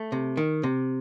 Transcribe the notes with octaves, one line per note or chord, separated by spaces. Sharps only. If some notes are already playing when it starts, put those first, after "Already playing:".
Already playing: A3
C3
D#3
C3